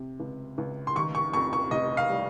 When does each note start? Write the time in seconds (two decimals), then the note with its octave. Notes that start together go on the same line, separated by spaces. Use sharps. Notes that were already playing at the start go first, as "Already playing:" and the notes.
Already playing: C3
0.20 C#2
0.58 C#2
0.87 C6
0.96 D#3 C#6
1.15 C#6
1.33 F2 C#6
1.53 C#6
1.71 F1 D#5
1.97 F5
2.10 G3